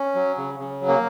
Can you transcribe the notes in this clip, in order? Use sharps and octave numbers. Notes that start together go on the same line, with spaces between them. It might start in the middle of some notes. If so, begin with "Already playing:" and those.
Already playing: C#4
F#3
C#3
C#3
F#3
A#3